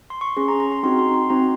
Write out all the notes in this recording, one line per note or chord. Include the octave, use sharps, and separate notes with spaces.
C6
C#6
C#4 G#4 C6
A#5
A#5
C6
C4 D#4 F#4 C6
C6
C6
C4 D#4 F#4 A#5